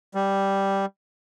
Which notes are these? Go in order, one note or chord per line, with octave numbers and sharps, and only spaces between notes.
G3